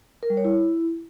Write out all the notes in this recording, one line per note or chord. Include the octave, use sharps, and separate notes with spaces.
A#4
G3
C#5
E4